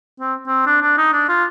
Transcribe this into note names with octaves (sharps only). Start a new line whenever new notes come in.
C4
C4
D4
D4
D#4
D4
F4